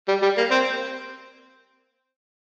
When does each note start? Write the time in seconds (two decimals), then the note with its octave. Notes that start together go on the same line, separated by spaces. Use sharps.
0.08 G3
0.22 G3
0.37 A#3
0.51 C4